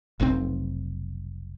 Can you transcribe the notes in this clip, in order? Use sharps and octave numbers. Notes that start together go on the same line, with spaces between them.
F1 B1 G#2 C4